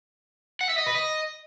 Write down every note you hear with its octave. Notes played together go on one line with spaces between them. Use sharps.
F#5
E5
D#5
B4
D#5